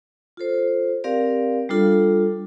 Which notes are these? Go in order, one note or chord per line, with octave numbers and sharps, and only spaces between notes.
F4 A4 C5
C4 G4 A#4 D5 F5
G3 D4 F4 A4